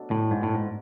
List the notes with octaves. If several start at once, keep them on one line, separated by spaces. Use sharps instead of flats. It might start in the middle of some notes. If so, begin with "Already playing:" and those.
Already playing: B2 F#3 A3 D4
A2
G#2
A2
G#2